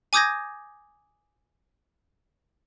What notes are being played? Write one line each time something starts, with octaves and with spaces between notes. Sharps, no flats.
G#5 D6 D#6 G6 G#6 A#6